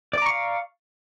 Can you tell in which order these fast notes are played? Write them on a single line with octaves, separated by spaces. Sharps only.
D5 D6 A#5 C#6 F5